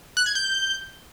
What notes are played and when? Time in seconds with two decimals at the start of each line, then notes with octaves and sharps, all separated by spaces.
0.17 F#6
0.26 G#6
0.35 G6